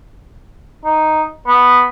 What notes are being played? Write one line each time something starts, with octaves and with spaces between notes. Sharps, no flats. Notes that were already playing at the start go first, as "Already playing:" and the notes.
D#4
B3